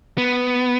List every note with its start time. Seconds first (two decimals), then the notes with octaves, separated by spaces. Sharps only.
0.18 B3